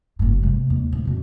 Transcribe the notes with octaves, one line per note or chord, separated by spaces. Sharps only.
F#1 G#2
C3 G#3
D#2
A2
F2 B2